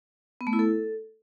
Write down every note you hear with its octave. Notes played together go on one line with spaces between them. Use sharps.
B3
A3
E4
A4